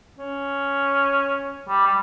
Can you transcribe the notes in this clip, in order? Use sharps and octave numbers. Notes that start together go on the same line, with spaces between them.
C#4
G3
G3